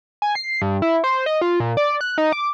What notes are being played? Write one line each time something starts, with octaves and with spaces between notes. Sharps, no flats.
G#5
C7
G2
E4
C5
D#5
F4
A#2
D5
F#6
D#4
D6